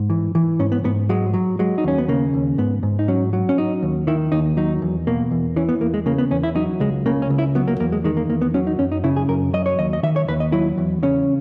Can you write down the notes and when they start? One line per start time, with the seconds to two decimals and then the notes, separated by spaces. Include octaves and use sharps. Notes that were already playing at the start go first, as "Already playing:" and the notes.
Already playing: G#2
0.10 E3
0.35 E3
0.59 G#2 C#4
0.72 B3
0.84 G#2 B3
1.09 F#3 G#3
1.34 F#3
1.59 F#3 G#3
1.78 D#4
1.84 D#2 C#4
1.98 B3
2.08 C#3 A#3
2.34 D#2
2.58 G#2 B3
2.83 G#2
2.99 D#4
3.08 F#3 C#4
3.33 F#3
3.49 C#4
3.58 F#3 D#4
3.83 D#2
4.07 D#3 E4
4.32 D#2 D#4
4.57 F#3 D#4
4.82 E2
5.07 B2 A#3
5.31 E2
5.56 E3 C#4
5.69 B3
5.81 E2 A#3
5.94 G#3
6.06 C#3 A#3
6.18 B3
6.31 E2 C#4
6.43 E4
6.56 F#3 D#4
6.80 C#2 G#3
7.06 C#3 A#3
7.22 C#4
7.30 C#2
7.38 E4
7.55 F#3 B3
7.68 A#3
7.80 E2 A#3
7.92 G#3
8.04 D#3 G#3
8.17 A#3
8.29 E2 A#3
8.42 B3
8.54 F#3 C#4
8.67 D#4
8.79 F#2 C#4
8.92 D#4
9.04 C#3 E4
9.16 G#4
9.29 F#2 A#4
9.53 F#3 D#5
9.66 C#5
9.79 D#2 D#5
9.93 D#5
10.03 D#3 E5
10.16 C#5
10.28 D#2 B4
10.40 D#5
10.52 F#3 E4
10.78 E2
11.03 C#3 C#4